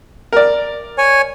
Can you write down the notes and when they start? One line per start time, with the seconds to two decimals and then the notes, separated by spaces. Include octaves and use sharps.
0.33 A#4 D5
0.98 C#5 G#5